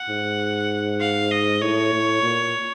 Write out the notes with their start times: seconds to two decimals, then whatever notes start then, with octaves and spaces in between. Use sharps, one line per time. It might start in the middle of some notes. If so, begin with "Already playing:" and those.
Already playing: F#5
0.09 G#2
1.00 F5
1.31 D#5
1.61 A2 C#5
1.93 A2
2.23 A#2